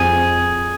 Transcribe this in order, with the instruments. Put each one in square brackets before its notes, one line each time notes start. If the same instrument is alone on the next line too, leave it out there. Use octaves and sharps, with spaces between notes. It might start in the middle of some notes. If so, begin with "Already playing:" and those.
Already playing: [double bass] F2 [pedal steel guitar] G#4